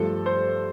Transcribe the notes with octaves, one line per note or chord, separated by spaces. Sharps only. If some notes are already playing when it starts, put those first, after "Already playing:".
Already playing: G2 F3 A3 A4
C5